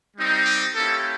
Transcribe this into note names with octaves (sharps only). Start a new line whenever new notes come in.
G3 C4 D#4
G4
A#3 C#4 E4 G4 A4